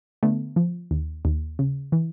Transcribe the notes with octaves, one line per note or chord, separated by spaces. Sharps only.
D3 A3 B3
F3
D#2
D#2
C#3
E3